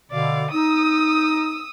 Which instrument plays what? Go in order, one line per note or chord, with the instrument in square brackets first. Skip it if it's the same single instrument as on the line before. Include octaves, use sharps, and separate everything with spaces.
[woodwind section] B2 D3 [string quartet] D5 F5
[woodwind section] D#4 [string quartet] D#6 E6